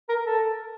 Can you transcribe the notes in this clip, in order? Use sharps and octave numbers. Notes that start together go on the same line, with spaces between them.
A#4
A4